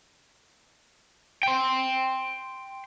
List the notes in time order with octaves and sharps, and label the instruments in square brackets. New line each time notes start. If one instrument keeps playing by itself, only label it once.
[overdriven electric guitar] G5 C6